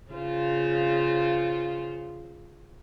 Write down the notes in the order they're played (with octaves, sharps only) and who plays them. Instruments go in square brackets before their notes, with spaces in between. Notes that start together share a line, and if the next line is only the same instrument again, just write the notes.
[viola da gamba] C#3 F4 C5